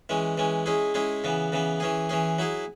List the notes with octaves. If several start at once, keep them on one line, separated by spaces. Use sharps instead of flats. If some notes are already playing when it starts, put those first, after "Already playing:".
E3 G#3 C#4
E3 G#3 C#4
G#3 C#4 E4 G#4
G#3 C#4 E4 G#4
C#3 E3 B3
C#3 E3 B3
E3 C#4 G#4
E3 C#4 G#4
F#3 E4 G#4